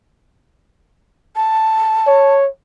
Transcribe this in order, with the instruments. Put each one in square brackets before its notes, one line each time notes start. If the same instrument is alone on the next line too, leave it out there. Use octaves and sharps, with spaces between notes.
[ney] A5
[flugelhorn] C#5